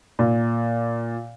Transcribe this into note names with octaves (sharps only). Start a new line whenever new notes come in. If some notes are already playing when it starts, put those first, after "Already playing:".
A#2